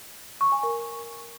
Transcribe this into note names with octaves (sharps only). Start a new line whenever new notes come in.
C#6
G#5
A#4